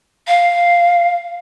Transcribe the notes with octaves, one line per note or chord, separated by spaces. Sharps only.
F5